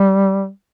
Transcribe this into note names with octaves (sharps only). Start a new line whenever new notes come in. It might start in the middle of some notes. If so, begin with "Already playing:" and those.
Already playing: G3